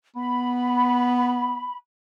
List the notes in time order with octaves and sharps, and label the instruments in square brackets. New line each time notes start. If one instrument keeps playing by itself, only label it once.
[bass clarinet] B3 [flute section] B5